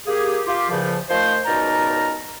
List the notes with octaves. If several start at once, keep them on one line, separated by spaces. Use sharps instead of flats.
A#3 G4 G#4
F4 G4
E2 A#2 C#3 F3
D#3 F3 A3 C5
C#2 B2 D#4 A#4 D5 A#5